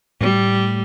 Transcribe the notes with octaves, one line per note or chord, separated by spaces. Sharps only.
A2 G3 A3